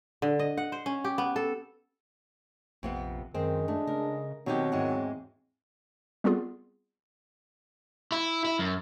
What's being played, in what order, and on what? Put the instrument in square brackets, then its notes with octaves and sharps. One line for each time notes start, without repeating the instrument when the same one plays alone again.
[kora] D3
D#5
F#5
C5
C#4
G4
B3
A4
[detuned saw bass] A#1 [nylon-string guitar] F2 C3 B3
[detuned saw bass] F#2 [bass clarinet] D#3 [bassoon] G#3 [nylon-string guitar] C4
[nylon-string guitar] A3 [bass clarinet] D4
[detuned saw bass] C#3 [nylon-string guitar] A#4
[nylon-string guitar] B2 D#4 G4 [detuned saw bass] D#3 [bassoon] F#3 [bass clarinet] C4
[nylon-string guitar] E2 G#2 G#3
[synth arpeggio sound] G3 B3 C4 F4 G#4
[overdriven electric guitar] E4
E4
F#2